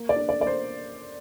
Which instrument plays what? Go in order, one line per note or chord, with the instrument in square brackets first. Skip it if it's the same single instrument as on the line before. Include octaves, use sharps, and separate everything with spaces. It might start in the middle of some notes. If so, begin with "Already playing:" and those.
Already playing: [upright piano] A#3
D5
D4
D5
A#3 D5
C5